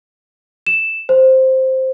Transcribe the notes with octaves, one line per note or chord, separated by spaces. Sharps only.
E7
C5